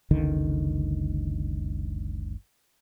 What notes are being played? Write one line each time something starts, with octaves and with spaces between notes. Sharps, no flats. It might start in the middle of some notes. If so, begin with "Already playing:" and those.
F#1 C#2 D3 D#3